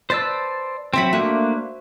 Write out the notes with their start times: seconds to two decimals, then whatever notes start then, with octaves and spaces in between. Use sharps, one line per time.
0.10 B4 C5 D5 A5 E6
0.94 F#3 C4 C5 E5 B5
1.13 A3 A#3 D4 F#4